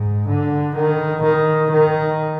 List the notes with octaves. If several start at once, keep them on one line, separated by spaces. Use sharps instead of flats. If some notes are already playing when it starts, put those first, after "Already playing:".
Already playing: G#2
D3
D#3
D#3
D#3